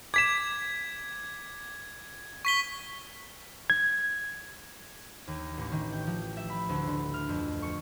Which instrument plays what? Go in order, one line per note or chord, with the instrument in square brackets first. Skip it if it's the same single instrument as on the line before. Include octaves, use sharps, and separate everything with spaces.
[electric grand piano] D6 B6 E7 [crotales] G#6
[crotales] C#6 B6 G7
[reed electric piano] G#6
[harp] D#2
A1
D#3
G5
F3
E5
B5
D2
D3
F6
F2
C#6